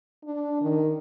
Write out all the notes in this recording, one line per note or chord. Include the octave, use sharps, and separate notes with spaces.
D4
D#3